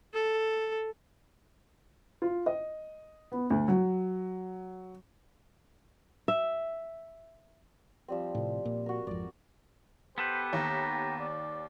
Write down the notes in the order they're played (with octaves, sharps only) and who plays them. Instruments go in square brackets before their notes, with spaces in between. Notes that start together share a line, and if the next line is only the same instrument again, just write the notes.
[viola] A4
[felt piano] F4
D#5
B3
D2
F#3
[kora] E5
[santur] F3 G3 C4
[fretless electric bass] A2 C3
A#2
[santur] F#4 A#4
[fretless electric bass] G#1 F2 [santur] D5
[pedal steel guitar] B3 A4 B4 [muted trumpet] G4 [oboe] C5
[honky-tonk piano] D#2 [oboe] A#5
[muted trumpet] D5